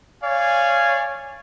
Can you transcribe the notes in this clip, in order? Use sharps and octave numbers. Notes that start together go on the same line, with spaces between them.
C#5 D5 F5 G#5